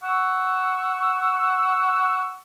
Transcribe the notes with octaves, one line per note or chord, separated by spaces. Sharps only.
F#5 C#6 E6